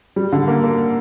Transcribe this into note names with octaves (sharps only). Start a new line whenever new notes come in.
G3
D3
A#3
A#3